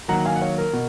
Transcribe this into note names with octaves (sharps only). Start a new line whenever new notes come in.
D#3 F#3 A#3 F#5 A#5
F5 G#5
F#5
C#5 F5
A#4
B2